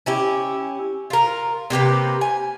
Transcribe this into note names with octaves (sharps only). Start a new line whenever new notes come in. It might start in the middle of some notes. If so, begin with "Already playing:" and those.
C#4 E4 G4
F4 A#4
C3 A#3 G4 B4
G#5